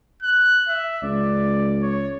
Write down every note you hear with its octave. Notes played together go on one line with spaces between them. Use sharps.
F#6
E5
C#2 D5
C#5